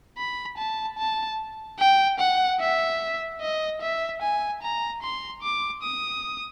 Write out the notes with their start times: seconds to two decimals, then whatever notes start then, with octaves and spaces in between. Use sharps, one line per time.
0.17 B5
0.58 A5
0.98 A5
1.79 G5
2.19 F#5
2.60 E5
3.41 D#5
3.81 E5
4.22 G#5
4.62 A#5
5.02 C6
5.42 D6
5.83 D#6